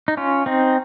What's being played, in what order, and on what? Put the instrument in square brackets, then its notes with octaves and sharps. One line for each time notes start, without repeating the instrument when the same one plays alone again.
[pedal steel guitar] D#4
C#4 F4
C4 D#4